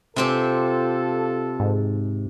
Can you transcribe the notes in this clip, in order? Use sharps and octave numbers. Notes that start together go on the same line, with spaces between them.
C3 C4 F4 G4 A4
G#2